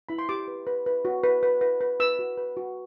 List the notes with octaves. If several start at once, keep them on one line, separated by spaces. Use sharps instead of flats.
E4 B5
C6
G4 D6
B4
B4
B4
F#4
B4
B4
B4
B4
B4 E6
F#4
B4
F#4